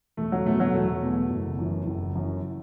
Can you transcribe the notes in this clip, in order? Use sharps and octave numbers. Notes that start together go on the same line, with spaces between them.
E1 A3
F#3
E2 B2 A3
F#3
E1 A3
E2 B2
F#1
F#2 E3
F#1
F#2 E3